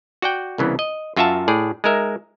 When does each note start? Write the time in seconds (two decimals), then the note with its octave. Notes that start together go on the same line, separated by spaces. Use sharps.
0.22 F#4 D5 F#5 G5
0.58 C2 C#3 E3 B3
0.79 D#5
1.16 F#2 F4 F#4 E5 F5 A5
1.48 A2 G#4 D5
1.84 G#3 D#4 A#4 E5